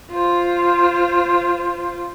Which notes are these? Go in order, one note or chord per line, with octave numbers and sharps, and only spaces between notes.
F4 C5